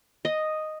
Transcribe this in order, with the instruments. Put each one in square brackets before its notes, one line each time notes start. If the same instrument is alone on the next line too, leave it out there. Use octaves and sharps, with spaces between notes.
[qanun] D#5